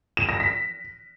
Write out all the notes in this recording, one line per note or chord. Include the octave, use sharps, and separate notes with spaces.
E7
A#6
B6